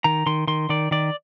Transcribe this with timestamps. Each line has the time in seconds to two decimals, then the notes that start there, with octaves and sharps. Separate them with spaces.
0.04 D#3 A#5
0.26 D#3 C6
0.47 D#3 C6
0.69 D#3 D5
0.91 D#3 D5